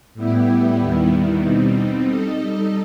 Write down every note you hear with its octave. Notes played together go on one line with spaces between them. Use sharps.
A2 G3 B3 E4 G4
D#2 D#3 G3 B3 E4
B2 G3 C4 D#4
G3 D#4 A4 D#5